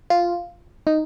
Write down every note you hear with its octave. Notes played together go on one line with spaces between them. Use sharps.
F4
D#4